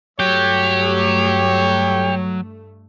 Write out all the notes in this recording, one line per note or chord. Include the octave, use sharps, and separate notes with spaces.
G2 F#3 A3 G4 C#5